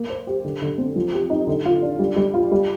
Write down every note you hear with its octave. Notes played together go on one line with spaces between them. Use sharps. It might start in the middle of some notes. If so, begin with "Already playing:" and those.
Already playing: A#3
C5
G4
D3
D3
C4
F3
G4
D#4
D3
F4
D4
G3
G3
F4
G3